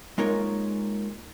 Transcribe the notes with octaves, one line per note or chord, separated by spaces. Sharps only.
G#3 A#3 D#4 F4 A#4 C#5